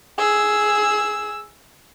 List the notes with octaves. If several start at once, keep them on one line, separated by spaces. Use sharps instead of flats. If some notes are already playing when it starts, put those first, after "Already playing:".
G#4 E6